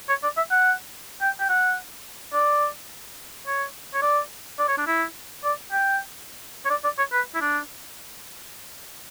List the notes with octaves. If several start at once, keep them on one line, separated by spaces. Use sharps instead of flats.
C#5
D5
E5
F#5
G5
G5
F#5
D5
C#5
C#5
D5
D5
C#5
D4
E4
D5
G5
C#5
D5
D5
C#5
B4
E4
D4